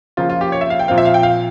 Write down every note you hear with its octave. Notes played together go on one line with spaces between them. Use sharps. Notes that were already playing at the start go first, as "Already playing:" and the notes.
C#3 F3 A#3 F4
F4
G4
C#5
E5
F5
G5
A#2 F3 C4 F5
E5
F5
G5
F5